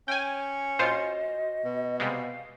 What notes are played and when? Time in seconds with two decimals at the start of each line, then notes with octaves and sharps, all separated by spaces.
0.08 C#4 G5 G#5
0.79 A#1 F4 F#4 C5 D#5
1.64 B2
2.00 C3 G3 G#3 F5